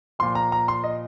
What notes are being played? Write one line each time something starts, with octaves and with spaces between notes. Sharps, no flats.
A#2 F3 C6
A#5
A#5
C6
D#5